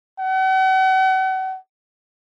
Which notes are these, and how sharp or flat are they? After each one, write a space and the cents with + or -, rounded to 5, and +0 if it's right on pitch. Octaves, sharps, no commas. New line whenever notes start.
F#5 +40